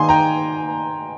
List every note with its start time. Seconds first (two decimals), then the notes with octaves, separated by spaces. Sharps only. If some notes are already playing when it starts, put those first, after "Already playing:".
Already playing: D#3 A#3 D#4 G#4 G#5 C6
0.09 G5 A#5